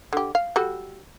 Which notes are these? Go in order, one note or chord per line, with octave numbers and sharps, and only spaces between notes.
D3 G4
F5
G3 F#4 A4